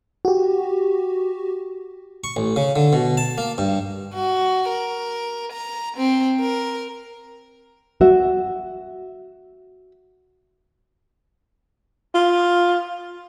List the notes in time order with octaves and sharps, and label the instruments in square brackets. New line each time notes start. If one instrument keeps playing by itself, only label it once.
[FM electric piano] F#4 G4
[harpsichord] C#6
A1
C#3
D3
B2
A5
A#3
G2
[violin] F#4
A#4
A#5
C4
A#4
[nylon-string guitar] F#4 E5
[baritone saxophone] F4